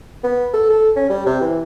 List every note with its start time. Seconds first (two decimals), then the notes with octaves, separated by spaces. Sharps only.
0.24 B3
0.53 A4
0.70 A4
0.96 C#4
1.10 G3
1.26 C3
1.41 E3